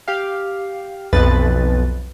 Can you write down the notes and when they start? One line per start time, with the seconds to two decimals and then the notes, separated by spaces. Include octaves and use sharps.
0.08 G4 F5
1.13 B1 F2 B4 A6